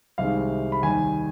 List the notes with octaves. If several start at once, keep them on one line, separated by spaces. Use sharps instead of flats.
C2 C3 D#3 G#3 F5
B5
D#2 D#3 G3 G#5